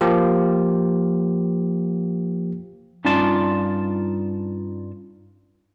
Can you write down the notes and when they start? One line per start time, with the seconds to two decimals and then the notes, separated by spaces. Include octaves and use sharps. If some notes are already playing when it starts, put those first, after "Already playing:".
0.01 F3 A#3 G4
3.05 G2 C#4 D#4 F4 D5 A5